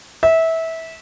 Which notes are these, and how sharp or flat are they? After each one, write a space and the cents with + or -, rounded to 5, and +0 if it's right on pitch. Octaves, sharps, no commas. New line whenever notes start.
E5 -20